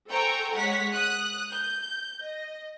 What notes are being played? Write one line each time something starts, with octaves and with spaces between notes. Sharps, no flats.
A4 C5 G5 G#5 A#5 C#6
G#3 C#5 F#5 B6
D#6 F#6
G6
D#5